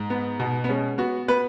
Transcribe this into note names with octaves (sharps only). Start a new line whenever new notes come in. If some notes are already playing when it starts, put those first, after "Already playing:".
Already playing: G#2
B3
B2
B3
G#3 C#4
B3 F#4
B3 B4